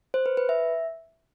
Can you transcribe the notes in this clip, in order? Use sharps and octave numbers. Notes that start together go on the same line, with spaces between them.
C5
B4
B4
E5